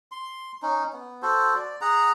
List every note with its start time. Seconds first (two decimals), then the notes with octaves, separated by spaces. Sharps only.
0.12 C6
0.62 C#4 D#4
0.93 B3
1.22 F#4 A4 C5
1.56 D5
1.81 G#4 F#5 A#5